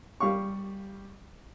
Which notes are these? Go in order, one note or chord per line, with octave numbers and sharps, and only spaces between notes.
G3 F5 C#6